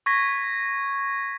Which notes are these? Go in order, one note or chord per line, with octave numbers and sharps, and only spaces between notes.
C#6 G#6 A#6 B6